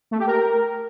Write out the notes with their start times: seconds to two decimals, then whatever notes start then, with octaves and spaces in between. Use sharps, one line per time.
0.11 A3
0.19 G4
0.27 A#4